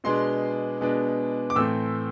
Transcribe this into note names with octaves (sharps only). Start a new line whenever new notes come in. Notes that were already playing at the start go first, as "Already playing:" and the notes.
B2 G#3 B3 D4 C6
B2 G#3 B3 D4
D6
A2 E3 A3 C4 E6